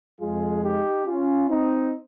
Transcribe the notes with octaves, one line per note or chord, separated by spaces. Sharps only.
F2 C3 F3 G#3 F4 G#4
D#4 G4
C#4 F4
C4 D#4